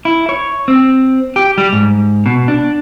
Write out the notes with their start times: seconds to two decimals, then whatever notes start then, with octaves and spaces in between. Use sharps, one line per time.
0.05 E4
0.29 C#5
0.68 C4
1.36 G4
1.58 G3
1.73 G#2
2.26 B2
2.48 D4